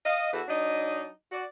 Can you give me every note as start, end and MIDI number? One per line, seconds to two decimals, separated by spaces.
0.06 0.33 75
0.06 0.33 77
0.33 0.43 40
0.33 0.43 52
0.33 0.43 66
0.33 0.43 69
0.49 1.09 54
0.49 1.09 62
0.49 1.09 63
0.49 1.09 75
1.32 1.45 66
1.32 1.45 74